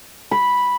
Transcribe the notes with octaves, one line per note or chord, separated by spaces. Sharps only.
B5